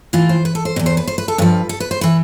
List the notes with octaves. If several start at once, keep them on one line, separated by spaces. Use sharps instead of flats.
A2 E3 F4
C5
B4
A4
C5
B2
E2
C5
B4
C5
B4
A4
G2 F3 B4
A4
B4
C5
E3 B4